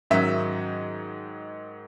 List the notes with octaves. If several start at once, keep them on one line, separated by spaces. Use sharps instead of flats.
G#2 D#3 F#3 C#4 E5